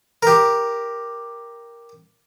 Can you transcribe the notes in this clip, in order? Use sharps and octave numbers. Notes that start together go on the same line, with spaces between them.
G4 A#4